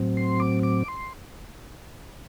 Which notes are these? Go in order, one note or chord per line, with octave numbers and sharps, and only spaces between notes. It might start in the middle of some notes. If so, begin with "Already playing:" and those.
Already playing: A2 F#3 C4
C6
D6
D6
C6